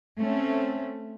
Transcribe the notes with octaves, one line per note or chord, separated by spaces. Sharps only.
A3 C4 C#4